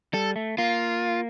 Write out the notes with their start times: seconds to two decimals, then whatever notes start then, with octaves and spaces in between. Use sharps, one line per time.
0.13 G3 A4
0.36 A3
0.58 A#3 F4